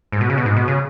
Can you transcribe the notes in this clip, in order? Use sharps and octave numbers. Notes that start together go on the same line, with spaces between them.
G#2
B2
C#3
B2
G#2
B2
C#3